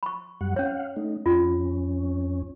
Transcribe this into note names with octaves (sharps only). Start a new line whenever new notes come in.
B5 C#6
F#2 G3 F#5
C#4 C#5 F5 F#5
A3 D#4
F2 C#4 F4